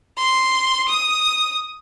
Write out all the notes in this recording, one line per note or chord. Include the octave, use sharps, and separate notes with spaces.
C6
D#6